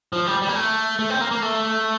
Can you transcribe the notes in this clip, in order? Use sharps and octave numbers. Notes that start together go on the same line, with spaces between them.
F3
G3
G3
A#3
A3
A3
C4
A#3
A#3
A3